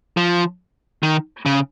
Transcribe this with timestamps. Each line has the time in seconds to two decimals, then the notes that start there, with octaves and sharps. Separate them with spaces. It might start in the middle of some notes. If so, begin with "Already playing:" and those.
0.17 F3
1.03 D#3
1.46 C#3